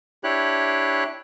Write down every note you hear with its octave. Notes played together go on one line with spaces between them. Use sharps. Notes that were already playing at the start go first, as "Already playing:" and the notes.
D4 E4 G4 C#5 F#6